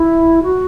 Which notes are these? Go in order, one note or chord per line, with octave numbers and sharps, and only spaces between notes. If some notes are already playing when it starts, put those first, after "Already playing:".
Already playing: E4
F#4